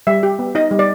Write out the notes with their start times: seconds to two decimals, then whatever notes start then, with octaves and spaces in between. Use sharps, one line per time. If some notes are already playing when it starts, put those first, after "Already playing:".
0.07 G3 E5
0.23 G4
0.39 B3
0.55 D#4 D#5
0.71 G3
0.79 D5